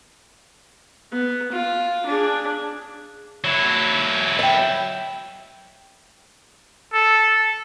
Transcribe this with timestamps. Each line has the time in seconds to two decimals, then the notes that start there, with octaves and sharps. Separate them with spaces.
1.13 B3
1.53 F4
2.06 D4 G#4
3.44 F#3 E4
4.39 E5 G5
6.93 A4